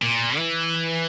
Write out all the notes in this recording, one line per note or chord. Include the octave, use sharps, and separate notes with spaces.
A#2
E3